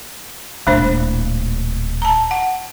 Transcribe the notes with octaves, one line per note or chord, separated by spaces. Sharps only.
D1 A#2 G#3 D4 C5
A5 A#5
F#5